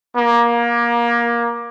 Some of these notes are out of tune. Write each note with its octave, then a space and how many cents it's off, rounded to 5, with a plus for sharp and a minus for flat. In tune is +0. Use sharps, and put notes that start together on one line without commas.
A#3 +20